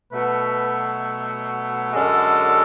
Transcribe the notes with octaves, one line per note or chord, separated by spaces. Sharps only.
B2 F#3 A3 B4
F#2 D3 G#3 A4